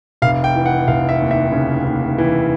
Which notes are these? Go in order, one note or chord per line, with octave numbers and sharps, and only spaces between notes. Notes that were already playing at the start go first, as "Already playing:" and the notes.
F1 F5
G5
E3
F#5
F1 F5
E5
D#2
E5
C#3
D#2
E3